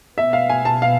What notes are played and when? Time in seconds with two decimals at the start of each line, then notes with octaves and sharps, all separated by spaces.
0.18 B2 B3 E5
0.33 F5
0.50 G#5
0.65 A5
0.82 F5